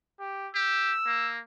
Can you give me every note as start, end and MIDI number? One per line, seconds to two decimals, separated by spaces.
0.20 0.49 67
0.55 0.93 67
0.55 1.30 88
1.06 1.39 58